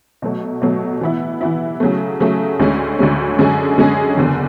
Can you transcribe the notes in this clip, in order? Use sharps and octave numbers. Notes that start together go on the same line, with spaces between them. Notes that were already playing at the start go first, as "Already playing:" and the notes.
B2 F#3 A3
B2 F#3 A3
E3 B3 E4
E3 B3 E4
C#3 F#3 A3
C#3 F#3 A3
D2 D3 G#3 C#4
D2 D3 G#3 C#4
F#2 D3 G#3 C#4 G#4
F#2 D3 G#3 C#4 G#4
F#1 E2 D3